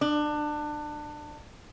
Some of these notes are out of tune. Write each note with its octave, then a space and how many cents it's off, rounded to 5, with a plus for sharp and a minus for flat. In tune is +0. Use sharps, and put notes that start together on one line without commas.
D4 +25